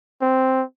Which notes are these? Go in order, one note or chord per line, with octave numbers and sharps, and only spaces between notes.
C4